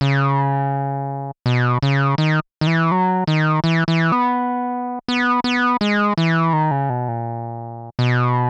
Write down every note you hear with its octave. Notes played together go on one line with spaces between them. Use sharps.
C#3
B2
C#3
D#3
D#3
E3
F#3
D#3
E3
E3
B3
B3
B3
G#3
E3
D#3
C#3
B2
A#2
B2